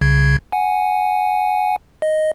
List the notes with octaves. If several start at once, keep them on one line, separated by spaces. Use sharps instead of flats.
C2 C#3 G#6
F#5 G#5
D#5